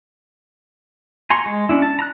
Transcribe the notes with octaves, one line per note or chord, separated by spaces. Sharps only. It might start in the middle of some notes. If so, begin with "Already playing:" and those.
G#5 A#5 C6 C#6
G#3
C#4 D4 E4
A5
A#5 F#6